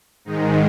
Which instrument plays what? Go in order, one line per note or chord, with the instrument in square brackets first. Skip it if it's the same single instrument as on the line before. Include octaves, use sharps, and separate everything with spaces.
[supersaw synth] G#2 D#3 G#3 D#4